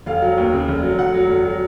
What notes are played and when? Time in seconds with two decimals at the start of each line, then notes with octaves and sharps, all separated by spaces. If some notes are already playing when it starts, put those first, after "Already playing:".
0.06 F1 F5
0.22 F#3
0.38 D#2
0.53 C#3
0.68 F1
0.83 F#3
0.99 F1 F#5
1.14 F#3
1.30 F1
1.45 F#3